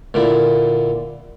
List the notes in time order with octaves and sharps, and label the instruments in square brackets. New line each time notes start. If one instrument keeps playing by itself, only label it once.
[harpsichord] A#2 D3 E4